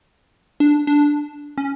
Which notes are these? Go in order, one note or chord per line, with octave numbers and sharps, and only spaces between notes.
D4
D4
C#4